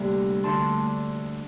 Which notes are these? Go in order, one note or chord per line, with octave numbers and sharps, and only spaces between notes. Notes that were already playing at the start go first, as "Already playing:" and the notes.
Already playing: D2 C3 G3 A#3 D4
D2 D3 A3 D4 A5 C6